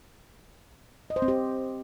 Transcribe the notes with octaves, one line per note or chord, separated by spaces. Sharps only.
D#5
C5
C4
G4